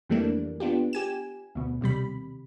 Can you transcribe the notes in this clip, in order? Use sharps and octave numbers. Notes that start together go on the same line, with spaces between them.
F2 E3 G3 A3 A#3 D4
B3 D4 F4 G4
G4 G#5 E7
D2 B2
D#2 C3 G3 B5